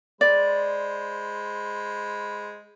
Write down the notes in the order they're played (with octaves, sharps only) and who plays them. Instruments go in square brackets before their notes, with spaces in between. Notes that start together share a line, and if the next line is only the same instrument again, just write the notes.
[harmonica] G#3 C5 B5 [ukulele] D5